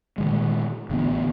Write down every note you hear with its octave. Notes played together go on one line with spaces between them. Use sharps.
A#2 D#3 G#3
A1 D3 E3 B3